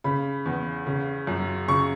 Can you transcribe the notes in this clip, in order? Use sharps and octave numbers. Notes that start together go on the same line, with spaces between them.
C#3 B5
E2
C#3
F#2
C#3 C#6